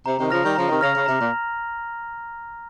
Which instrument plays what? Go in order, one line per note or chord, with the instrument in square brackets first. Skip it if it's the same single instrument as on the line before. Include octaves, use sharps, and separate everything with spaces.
[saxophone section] C3 [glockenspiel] A#5
[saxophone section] C3 D#3
[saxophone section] C#3 F3 [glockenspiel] F6 A#6 F7
[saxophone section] D#3 G3
[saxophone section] C#3 F3 [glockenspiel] A#5
[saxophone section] C3 D#3
[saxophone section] C#3 [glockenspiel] F6 A#6 F7
[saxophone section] C#3
[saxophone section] C3 [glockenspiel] A#5
[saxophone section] A#2